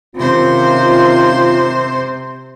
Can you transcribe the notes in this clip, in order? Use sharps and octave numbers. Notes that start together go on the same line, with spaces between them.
C3 D#3 C#4 F4 C5